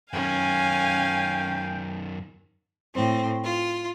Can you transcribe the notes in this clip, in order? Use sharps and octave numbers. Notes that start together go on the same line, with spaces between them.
F#2 D#3 C#4 F5 G5 G#5
A2 C4
F4